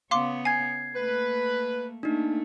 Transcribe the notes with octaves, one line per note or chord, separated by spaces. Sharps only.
C#3 B3 C#5 F5 C6 D6
G#5 G#6 C7
A3 A#3 B4
A3 A#3 D4 D#4